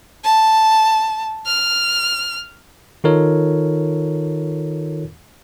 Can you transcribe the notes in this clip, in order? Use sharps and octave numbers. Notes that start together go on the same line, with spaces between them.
A5
F6
D#3 D#4 F4 A4 A#4 C#5